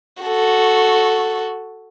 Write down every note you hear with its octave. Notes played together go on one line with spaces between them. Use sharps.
F#4 A4